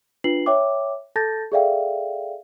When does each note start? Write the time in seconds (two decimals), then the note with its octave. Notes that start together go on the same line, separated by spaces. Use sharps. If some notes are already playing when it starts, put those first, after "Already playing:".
0.24 D4 F4 B4 C7 F#7
0.46 C#5 E5 G5 D6
1.16 A4 A5 G6 A6 A#6
1.52 G#4 A4 D5 E5 F5 G5